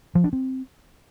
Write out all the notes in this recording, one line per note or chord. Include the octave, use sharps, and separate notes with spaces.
F3
D4
C4